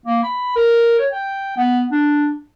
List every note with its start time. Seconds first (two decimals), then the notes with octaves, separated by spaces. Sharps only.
0.06 A#3
0.23 B5
0.56 A#4
0.99 C#5
1.12 G5
1.57 B3
1.91 D4